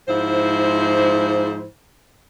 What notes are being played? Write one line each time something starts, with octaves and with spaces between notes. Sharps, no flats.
G#2 F3 E4 C5